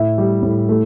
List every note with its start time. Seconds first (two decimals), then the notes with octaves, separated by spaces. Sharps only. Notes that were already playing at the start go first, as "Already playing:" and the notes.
Already playing: A2 E4 E5
0.18 G3
0.43 A2
0.69 A3